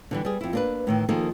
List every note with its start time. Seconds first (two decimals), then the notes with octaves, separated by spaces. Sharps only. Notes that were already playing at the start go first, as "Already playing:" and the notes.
0.11 D3 E3 G3
0.25 G3 G#4
0.41 F2 E4
0.53 A#3 D4 B4
0.87 A2 D#3 E3
1.09 D#3 F3 A#3 D#4 G#4 A4